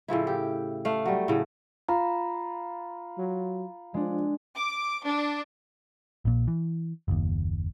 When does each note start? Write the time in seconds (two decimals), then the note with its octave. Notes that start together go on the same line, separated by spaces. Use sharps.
0.08 A2 C#3 F3 E4
0.27 G4
0.85 A3 F5
1.06 F#3 G3
1.28 A2 C#3
1.88 F4 A#5 B5
3.18 F#3
3.94 F3 G#3 D4
4.57 D6
5.05 D4
6.25 A#1 A#2
6.48 E3
7.08 F#1 D#2